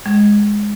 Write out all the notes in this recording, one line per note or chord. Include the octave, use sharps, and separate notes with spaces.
G#3